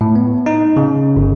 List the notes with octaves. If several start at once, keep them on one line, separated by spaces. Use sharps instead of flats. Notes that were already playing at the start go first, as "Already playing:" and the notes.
A2
B3
D#4
C#3
G1